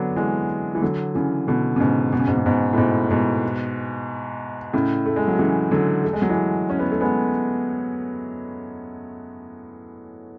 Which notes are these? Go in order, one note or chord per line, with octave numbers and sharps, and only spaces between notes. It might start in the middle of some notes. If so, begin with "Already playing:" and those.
Already playing: D3 F#3 B3 D4
E3 G#3
E3
D3 F#3
C#3 E3
B2 D3
C#3
G#2 B2
B2
C#3
G#2 B2
C#3
G#2 B2
A2
G#2 B2
G#2 B2
A2 C#3
A3
G#3
F#3
C#3 E3
D3 F#3
A3
G#3
F#3
E3 G#3
C#4
B3
A3
G#3 B3